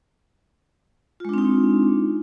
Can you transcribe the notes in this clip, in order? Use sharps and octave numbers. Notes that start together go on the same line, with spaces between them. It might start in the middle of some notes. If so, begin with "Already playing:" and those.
G#3 C4 D4 D#4 F4